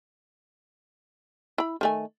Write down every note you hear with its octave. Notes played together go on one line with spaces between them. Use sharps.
E4 B5
D#3 A3 G#5